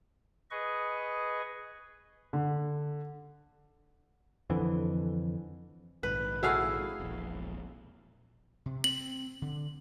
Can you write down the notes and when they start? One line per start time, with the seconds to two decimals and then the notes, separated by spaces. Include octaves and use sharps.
0.51 G#4 B4 D#5 C#6
2.33 D3
4.50 F2 D3 E3
6.03 A#1 G#2 D#3 B4
6.43 E4 F#4 G#4 A4 B4 F5
7.00 E1 A#1
8.66 C3
8.84 C4 F#7
9.42 D3